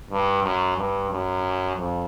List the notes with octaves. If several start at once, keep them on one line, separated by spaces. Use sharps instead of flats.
G2
F#2
G2
F#2
F2